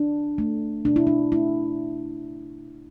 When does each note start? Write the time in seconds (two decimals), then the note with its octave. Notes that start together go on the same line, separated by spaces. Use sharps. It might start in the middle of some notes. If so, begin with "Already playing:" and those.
Already playing: D4
0.38 A3
0.85 B2 D4
0.96 E4
1.07 D4
1.32 A3 E4